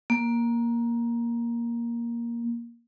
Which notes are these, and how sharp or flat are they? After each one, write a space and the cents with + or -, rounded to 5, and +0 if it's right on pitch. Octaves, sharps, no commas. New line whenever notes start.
A#3 +10